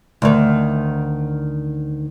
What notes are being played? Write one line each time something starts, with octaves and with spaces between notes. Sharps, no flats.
D2 D#3